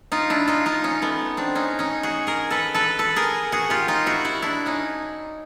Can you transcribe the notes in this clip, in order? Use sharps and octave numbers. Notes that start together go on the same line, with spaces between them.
D#4 F4
D4 E4
D#4 F4
D#4 F4
C#4 D#4
A3 B3
C4 D4
C#4 D#4
C#4 D#4
F#4 G#4
G#4 A#4
A4 B4
A4 B4
A4 B4
G#4 A#4
F#4 G#4
F4 G4
D#4 F4
E4 F#4
E4 F#4
D4 E4
C#4 D#4